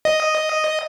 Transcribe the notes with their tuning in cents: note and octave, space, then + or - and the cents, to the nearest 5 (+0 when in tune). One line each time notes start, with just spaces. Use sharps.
D#5 +0